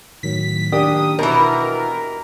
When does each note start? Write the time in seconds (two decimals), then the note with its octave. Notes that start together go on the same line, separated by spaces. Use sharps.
0.23 A2 D#3 F#3 B6
0.72 D#3 A#3 D4 G4 D#6
1.19 B2 E3 A#4 D#5 B5